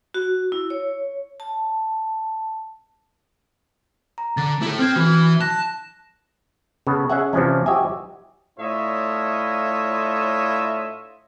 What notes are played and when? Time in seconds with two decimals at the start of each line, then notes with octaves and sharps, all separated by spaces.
0.14 F#4
0.52 E4
0.70 C#5
1.40 A5
4.18 A#5
4.37 D3 A6
4.62 E4 A4
4.79 C4 F6 G#6
4.96 E3 D4 E4 F#4
5.41 A5 F#6 A#6
6.87 C#3 B3 A4
7.10 C#4 G#4 D#5 E5 F#5
7.33 C3 E3 F3 C#4 D4
7.66 F#4 G4 D#5 E5 G#5
8.59 A2 D4 F4 C#5 D#5 E5